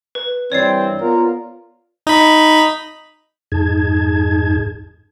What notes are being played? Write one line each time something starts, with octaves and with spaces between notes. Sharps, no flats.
B4
G2 E3 C4 C#5 D5 C7
B3 F4 A#4
D#4 B5
F2 G#2 D#4 G#4 A5 G#6